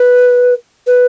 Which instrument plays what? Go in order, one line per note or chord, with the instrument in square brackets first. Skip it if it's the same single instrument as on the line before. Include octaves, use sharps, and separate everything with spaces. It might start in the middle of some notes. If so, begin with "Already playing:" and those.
Already playing: [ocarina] B4
B4